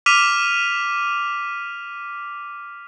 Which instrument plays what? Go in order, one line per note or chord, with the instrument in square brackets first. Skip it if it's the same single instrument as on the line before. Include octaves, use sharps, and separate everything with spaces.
[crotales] D6 F6 B6 D#7 F7